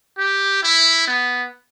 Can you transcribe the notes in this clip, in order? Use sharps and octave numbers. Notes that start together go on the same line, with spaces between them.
G4
E4
B3